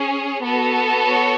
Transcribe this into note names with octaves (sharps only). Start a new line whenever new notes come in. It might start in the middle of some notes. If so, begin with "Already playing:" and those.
Already playing: C#4 G#4
B3 F#4 A4
C#5